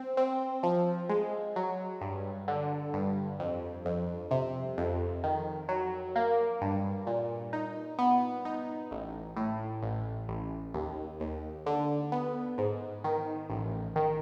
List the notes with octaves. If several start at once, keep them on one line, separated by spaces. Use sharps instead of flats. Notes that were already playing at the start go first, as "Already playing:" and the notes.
Already playing: C4
C4
F3
G#3
F#3
G2
D3
G2
F2
F2
C3
F2
D#3
F#3
A#3
G2
A#2
D#4
B3
D#4
A1
A2
A1
A1
D#2
D#2
D3
B3
G#2
D#3
A1
D#3